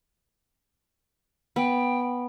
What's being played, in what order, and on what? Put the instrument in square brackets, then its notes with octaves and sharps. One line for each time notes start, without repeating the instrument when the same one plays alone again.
[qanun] B3 [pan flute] G5